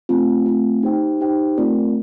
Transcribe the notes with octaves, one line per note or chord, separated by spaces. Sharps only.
A3 C4 F4
A3 C4 F4
D#4 G4 C5 G5
D#4 G4 C5 G5
A3 C4 F4 A#4 D5